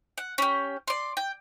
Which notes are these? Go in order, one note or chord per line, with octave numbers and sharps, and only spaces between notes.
F#5
C#4 G4
D5 C6
G5